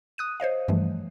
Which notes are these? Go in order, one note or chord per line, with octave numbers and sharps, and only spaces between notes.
D#6 F#6 D#7
C5 C#5 D#5 F5
G2 E3 F3 G3 A3